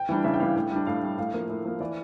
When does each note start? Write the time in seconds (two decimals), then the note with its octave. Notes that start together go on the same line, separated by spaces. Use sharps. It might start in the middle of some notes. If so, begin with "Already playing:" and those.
Already playing: G5
0.09 E3 G3 D4
0.24 C#3 E5
0.34 G5
0.40 E3 G3 D4 F5
0.56 A2 G5
0.71 G3 D4
0.87 A2 F5
1.03 G3 D4
1.18 A2 F5
1.34 F3 A#3
1.49 A2
1.65 F3 A#3
1.80 E3 D5